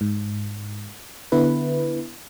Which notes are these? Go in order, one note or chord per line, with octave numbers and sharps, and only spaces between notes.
G#2
D3 B3 E4 B4